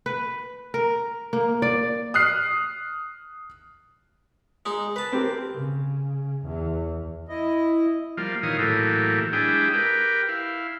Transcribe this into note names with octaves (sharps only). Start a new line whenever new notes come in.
B4
A#4
A#3
D5
D#6 F6 F#6 C7
G#3 D#4
B4 A5
C4 G4 A#4
C#3
E2
E4 D#5
F3 G3 A#3 F4
A#2 D#3 E3 C#5 F5 D#6
A2 E3 F#3 A#3 G4 A4
G#3 D4 E4 G4 G#4 G5
G4 A#4 B4 G5
E4 F5